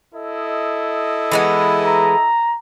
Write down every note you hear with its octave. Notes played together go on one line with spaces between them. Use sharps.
E4 A4 D#5
E3 G#3 B3
A#5